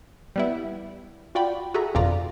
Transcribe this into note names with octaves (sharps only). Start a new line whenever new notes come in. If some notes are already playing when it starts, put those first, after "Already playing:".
G3 B3 E4
F4 F#4 D5 G5 B5
F#4 G#4 A4 E5 A#5
G1 F2 B2 F4 D5 A#5